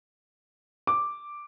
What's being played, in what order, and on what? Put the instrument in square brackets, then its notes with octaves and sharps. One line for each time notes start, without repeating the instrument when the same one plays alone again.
[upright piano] D6